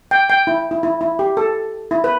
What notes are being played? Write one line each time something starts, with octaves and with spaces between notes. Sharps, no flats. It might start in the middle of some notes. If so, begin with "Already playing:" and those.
G5
G5
E4
E4
E4
E4
G4
A4
E4
B4